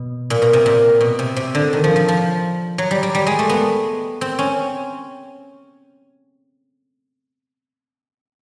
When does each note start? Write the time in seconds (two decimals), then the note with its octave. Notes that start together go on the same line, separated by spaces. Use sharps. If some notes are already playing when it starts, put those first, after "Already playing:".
Already playing: B2
0.30 A#2
0.42 B2
0.53 C3
0.66 A#2
1.01 B2
1.19 C3
1.37 C3
1.55 D3
1.73 D#3
1.84 F3
1.96 F3
2.08 F3
2.78 F#3
2.91 G3
3.03 G3
3.15 G3
3.27 G#3
3.39 A3
3.49 B3
4.21 C4
4.39 C#4